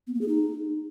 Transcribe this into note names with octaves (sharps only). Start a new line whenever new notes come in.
B3
A#3
G#4
D#4